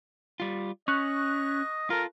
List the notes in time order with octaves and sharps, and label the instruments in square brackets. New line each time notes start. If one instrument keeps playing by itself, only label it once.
[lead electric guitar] G3 F4
[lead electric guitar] C#4 [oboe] D#5 [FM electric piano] C#6 F#6
[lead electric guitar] F4 A4 [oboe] A#4